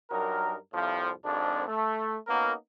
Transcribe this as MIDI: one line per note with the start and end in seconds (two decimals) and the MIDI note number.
0.11 0.56 43
0.11 0.56 54
0.11 0.56 63
0.11 0.56 70
0.73 1.11 36
0.73 1.11 41
0.73 1.11 45
0.73 1.11 53
1.24 1.64 32
1.24 1.64 41
1.24 1.64 62
1.68 2.17 57
2.28 2.52 58
2.28 2.52 59
2.28 2.52 61
2.28 2.52 63
2.28 2.52 66
2.28 2.52 70